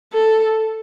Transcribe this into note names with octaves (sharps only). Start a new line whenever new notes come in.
A4